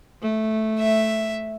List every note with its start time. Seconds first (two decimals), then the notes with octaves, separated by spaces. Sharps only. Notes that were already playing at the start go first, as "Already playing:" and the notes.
0.22 A3
0.79 E5